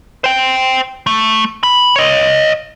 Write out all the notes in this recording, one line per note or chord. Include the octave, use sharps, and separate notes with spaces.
C5 G5
A3
B5
C#5 D#5